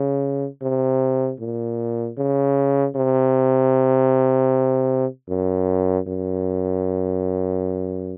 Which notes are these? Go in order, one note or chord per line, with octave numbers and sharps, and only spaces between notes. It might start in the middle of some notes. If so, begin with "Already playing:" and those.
Already playing: C#3
C3
A#2
C#3
C3
F#2
F#2